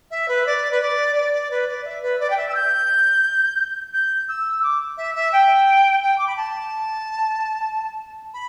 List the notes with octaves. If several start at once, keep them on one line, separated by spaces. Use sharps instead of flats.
E5
B4
D5
B4
D5
D5
D5
B4
D5
E5
B4
D5
G5
E5
E6
G6
G6
E6
D6
E5
E5
G5
G5
D6
B5
A5
B5